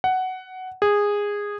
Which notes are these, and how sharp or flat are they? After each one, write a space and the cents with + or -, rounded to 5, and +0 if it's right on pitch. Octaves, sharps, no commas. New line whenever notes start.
F#5 +10
G#4 -15